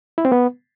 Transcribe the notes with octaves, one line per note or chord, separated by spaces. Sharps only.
E4
C4
B3